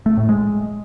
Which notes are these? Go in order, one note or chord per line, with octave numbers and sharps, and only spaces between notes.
A3
A2
G#3